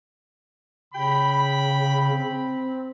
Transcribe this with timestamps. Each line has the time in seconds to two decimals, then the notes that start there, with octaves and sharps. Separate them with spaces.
0.94 C#3 G5 B5
2.12 C4